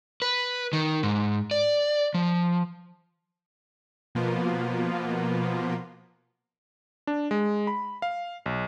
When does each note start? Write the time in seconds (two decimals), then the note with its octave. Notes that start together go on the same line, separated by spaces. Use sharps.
0.22 B4
0.73 D#3
1.03 G#2
1.51 D5
2.14 F3
4.15 B2 F3 A#3 B3 F4
7.07 D4
7.31 G#3
7.67 B5
8.02 F5
8.46 B1